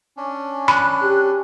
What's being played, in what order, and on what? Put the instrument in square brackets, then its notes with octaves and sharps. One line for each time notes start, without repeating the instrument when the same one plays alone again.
[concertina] C#4 D4
[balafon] B5 [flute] F#6
[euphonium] G4